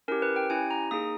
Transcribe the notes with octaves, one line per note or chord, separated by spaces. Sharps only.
C#4 E4 G4 A#4
B4
G5
C#4 E4 G4 G#5
A#5
A#3 D#4 G#4 D#6